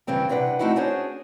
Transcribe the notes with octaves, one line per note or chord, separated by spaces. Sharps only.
G2 C#3 E3 C4 G4
C3 D4 B4 C#5 F#5
A3 C4 D#4 E4 F#4 F#5
C#4 D4 F#4 G#4 C5 C#5